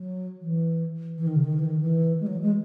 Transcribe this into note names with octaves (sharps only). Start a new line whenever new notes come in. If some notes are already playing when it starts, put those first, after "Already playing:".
Already playing: F#3
E3
E3
D#3
C#3
D#3
E3
D#3
E3
G#3
F#3
G#3